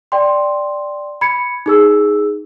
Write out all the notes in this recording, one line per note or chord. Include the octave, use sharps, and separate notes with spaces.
D5 G5 C6
B5 G#6 C#7
D#4 G#4 E6